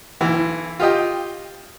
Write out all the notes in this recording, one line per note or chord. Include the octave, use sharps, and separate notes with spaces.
B1 E3
F4 G4 D#5 G5